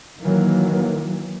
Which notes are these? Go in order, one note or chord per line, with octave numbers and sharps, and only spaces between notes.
D#3 E3 F#3 A#3